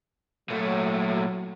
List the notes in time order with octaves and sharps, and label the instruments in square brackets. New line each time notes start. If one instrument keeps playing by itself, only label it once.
[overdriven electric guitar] A#2 A3 [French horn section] F#3